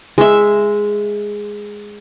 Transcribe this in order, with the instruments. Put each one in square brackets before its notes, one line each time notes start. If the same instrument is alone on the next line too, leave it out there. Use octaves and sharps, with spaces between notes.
[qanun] G#3 E5